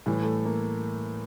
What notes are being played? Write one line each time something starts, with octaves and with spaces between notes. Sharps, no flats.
A2 E3 G3
A3
A#3